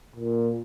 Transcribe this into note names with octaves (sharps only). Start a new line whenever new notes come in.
A#2